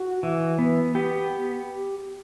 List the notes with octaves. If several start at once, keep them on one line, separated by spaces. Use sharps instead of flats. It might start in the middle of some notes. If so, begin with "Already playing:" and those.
Already playing: F#4
E3
B3
B3 G4